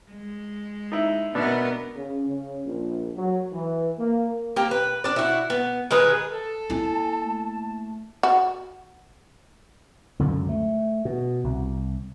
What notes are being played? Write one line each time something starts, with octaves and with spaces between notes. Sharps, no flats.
G#3
D#4 E4
B2 B3 D4 A#4 E5
C#3
C#3
A#1
F#3
E3
A#3
A#3 G4
B4
D4 D5
E4 F#4
B3
D#3 G#3 G#4 B4
A4 A5
A#3 E4 G#5
A3
F#4
C#2 F#2 D3
A3
B2
C2